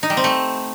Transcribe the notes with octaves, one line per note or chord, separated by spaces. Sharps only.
D#4
G3
C4
A3